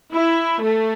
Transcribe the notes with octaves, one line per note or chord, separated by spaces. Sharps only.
E4
A3